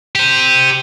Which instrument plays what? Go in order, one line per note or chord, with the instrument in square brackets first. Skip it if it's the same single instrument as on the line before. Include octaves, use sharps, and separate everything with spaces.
[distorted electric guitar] G4 C5